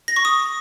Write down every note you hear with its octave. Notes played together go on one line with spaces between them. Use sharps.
A#6
C#6
D#6